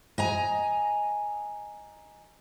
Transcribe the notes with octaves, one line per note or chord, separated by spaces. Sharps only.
D#5 G#5 A#5